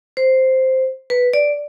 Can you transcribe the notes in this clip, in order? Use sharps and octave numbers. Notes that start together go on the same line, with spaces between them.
C5
B4
D5